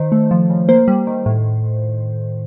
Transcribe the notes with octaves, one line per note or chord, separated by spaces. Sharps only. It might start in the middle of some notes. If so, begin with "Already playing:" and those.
Already playing: D#3 C5
A3
F3
C#3
A#3 C5
G3
D#3
A2